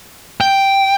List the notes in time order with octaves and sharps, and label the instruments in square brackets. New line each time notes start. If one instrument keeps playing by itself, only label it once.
[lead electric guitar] G5